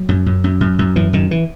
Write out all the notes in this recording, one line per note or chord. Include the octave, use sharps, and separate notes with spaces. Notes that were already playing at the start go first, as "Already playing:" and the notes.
Already playing: F#3
F#2
F#2
F#2
F#2
F#2
F#2 E3
F#2 D#3
E3